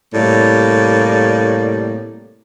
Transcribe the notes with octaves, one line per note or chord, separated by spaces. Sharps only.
A2 C3 G3 A#3